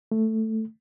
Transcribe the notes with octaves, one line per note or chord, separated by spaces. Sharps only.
A3